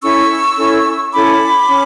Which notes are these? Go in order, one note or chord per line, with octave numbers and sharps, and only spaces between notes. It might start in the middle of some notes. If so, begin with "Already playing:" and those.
C#4 E4 A4 C#6 E6
C#4 E4 A4
C#4 E4 A4 B5 D6
C#4